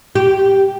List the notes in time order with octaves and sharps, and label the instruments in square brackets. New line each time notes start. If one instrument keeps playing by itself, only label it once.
[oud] G4